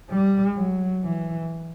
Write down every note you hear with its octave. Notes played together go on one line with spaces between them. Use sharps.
G3
F#3
E3